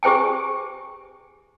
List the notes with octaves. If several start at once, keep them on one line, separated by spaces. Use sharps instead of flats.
G4 G#4 C5 G5 G#5